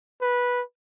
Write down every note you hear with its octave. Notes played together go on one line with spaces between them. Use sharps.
B4